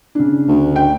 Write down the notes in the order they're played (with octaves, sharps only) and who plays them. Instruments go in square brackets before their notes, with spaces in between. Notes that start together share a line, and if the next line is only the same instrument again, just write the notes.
[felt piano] C#3 D4
[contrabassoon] D2
[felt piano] G5